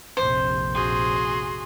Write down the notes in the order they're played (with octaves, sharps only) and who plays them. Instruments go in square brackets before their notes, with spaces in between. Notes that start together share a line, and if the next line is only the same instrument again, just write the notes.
[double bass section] F1 A#1 C3 [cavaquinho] C5
[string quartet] F#4 G#4 C6